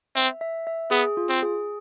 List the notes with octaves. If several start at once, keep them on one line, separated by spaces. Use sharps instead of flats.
C4 E5
E5
E5
B3 G#4
F4
C4
G#4